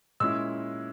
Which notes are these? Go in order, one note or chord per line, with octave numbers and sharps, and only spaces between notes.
A#2 G#3 C#4 E4 E6